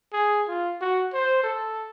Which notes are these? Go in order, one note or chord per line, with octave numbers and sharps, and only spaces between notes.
G#4
F4
F#4
C5
A4